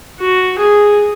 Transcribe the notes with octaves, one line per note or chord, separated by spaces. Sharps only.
F#4
G#4